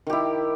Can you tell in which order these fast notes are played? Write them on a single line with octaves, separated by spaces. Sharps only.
D#3 G4 E4